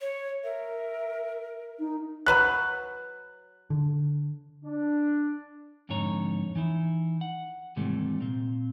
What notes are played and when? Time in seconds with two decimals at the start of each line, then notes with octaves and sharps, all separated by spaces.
0.01 C#5
0.44 A#4 E5
1.79 D#4
2.26 F#3 B4 C#5 F#6
3.70 D3
4.64 D4
5.89 F2 G#2 D3 D#4 C#5 A#5
6.56 E3 D#4 E4
7.21 F#5
7.76 D#2 G#2 C3 E3 G3 A3
8.20 A#2 C4